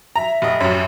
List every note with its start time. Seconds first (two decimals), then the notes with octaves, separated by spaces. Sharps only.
0.16 E5 A#5
0.42 F1 D#5
0.60 A1 F#2